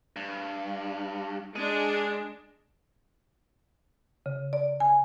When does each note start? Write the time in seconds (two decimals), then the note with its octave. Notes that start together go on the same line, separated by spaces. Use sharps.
0.16 G2
1.56 G#3 D4 G#4
4.26 C#3
4.53 D5
4.80 G#5